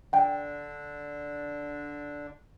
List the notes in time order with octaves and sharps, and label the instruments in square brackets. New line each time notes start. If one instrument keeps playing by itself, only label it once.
[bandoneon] D3 D4 [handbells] F#5 G5